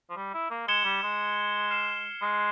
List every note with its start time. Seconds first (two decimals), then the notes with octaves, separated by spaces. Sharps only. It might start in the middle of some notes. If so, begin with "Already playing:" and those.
0.10 F3
0.17 G3
0.34 E4
0.51 A#3
0.68 G#3 G#6 C#7 E7 G7
0.85 G3
1.03 G#3
1.71 F6 C7 E7 G7
2.22 G#3